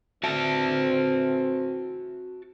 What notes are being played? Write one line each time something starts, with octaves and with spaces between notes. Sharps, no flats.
A2 E3 C4 F#4 E5 A5